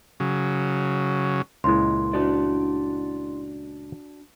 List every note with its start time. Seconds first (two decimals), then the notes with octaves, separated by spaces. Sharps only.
0.20 C#3 F#3
1.64 C#2 A#2 G#3 E4 C6
2.13 D4 F#4 D5